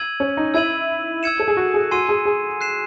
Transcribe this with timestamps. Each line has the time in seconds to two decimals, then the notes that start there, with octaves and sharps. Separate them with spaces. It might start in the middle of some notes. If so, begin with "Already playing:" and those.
Already playing: E6 G#6 D#7 F#7
0.20 C#4
0.37 D#4
0.54 E4 E6 G#6 D#7 F#7
1.23 E6 G#6 C#7 E7
1.40 A4
1.48 G#4
1.57 F#4
1.74 G#4
1.91 F#4 G#5 C6 E6 C7 D#7
2.09 G#4
2.25 G#4
2.61 F#6 C7 E7